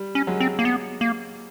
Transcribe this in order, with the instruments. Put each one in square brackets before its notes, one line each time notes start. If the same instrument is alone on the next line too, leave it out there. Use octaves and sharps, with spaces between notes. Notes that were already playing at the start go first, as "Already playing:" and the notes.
Already playing: [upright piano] G3
[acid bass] C#4
[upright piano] F#3 G#3
[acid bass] C4
A#3
B3
A#3